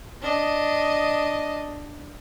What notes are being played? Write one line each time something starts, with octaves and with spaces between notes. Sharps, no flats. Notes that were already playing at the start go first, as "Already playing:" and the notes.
D4 D#5